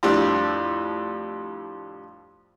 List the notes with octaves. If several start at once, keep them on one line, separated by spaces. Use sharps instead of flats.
F2 A2 G3 D4